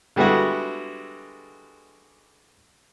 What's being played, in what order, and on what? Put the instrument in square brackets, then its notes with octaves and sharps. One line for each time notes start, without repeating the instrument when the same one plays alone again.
[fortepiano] D3 G3 G#3 B3 E4 F#4